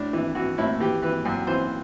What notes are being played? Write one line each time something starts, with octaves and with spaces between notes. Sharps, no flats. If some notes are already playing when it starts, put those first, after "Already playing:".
Already playing: A2 D4
E3 E4
E3 F#4
A2 E4
E3 G4
E3 B4
F#2
E3 C5